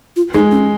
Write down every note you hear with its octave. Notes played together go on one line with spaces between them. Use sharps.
F4
G#3 D#4
C#4